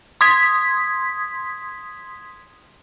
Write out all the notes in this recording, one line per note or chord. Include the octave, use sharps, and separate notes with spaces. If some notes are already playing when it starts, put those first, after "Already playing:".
C6 D#6 G#6 B6